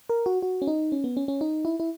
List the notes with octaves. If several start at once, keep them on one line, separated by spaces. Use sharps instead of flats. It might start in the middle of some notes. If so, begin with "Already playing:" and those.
A#4
F#4
F#4
C#4
D#4
C#4
B3
C#4
C#4
D#4
E4
E4